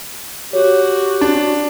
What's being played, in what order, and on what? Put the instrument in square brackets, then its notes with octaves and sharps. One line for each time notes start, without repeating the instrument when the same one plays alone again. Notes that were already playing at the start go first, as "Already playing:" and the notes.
[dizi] F#4 [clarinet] G4 [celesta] C#5
[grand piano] D4